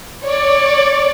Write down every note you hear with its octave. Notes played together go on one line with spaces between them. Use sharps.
C#5 D5